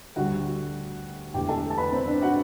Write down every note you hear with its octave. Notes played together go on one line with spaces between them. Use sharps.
D2 D3 G3 F#4 F#5
E1 E2 D3 A3 G4 G5
A4 A5
A5
B4 B5
C4 C5
D4 D5
F#4 F#5